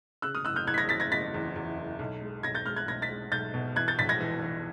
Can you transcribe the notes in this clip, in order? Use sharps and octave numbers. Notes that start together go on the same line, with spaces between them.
C#3 E6 F#6
D#6 F6
F#1 E6 F#6
F6 G6
F#1 F#6 G#6
B6
G#6 A#6
F#1 A6 B6
G#6 A#6
F#1 A6 B6
E2
E2
F#1
B1
G#3
B1 G#6 A#6
G6 A6
G#3 F6 G6
F#6 G#6
B1 G#6 A#6
A6 B6
G#3
B1 G6 A6
B2
E3 F#6 G#6
G6 A6
A#1 A6 B6
G#6 A#6
E3
E3